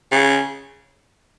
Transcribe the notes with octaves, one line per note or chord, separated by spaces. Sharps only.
C#3